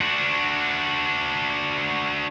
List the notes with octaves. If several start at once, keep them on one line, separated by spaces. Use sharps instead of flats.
D4 F#4